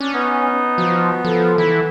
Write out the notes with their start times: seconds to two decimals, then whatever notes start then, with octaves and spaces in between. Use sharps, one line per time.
0.01 C#4 D4
0.14 B3 D#4
0.78 F3 F#4
1.25 F3 A4
1.58 E3 E4